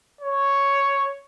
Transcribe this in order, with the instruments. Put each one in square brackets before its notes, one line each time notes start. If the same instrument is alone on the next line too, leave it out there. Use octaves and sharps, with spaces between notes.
[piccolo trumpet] C#5